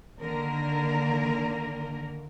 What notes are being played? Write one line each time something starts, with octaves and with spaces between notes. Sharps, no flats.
D3 D#3 A#3 A#4